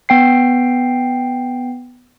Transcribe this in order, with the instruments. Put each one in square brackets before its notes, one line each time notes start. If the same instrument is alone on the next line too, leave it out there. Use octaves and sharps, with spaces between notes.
[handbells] B3 G5 C7